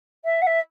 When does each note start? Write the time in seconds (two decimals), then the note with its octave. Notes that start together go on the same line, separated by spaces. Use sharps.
0.24 E5
0.41 F#5
0.46 E5